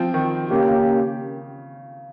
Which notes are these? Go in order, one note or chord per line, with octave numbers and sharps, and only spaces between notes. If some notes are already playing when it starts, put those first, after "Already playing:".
Already playing: F3 C4
D#3
C#3 A#3 C#4 G4